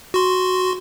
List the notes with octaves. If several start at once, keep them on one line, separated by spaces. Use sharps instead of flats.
F#4 C6